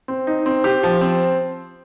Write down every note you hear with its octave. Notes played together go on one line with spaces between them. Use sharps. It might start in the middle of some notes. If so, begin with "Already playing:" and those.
C4
D#4
C4
G4
F3
C4